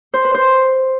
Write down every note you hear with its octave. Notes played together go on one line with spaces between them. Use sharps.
C5
B4
C5